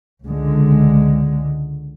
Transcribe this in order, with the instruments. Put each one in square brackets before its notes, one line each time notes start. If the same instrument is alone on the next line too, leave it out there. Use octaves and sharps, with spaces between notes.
[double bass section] C#2 D3 G#3